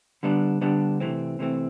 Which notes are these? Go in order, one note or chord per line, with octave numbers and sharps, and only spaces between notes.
D3 G3 B3 D4
D3 G3 B3 D4
C3 E3 A3 C4
C3 E3 A3 C4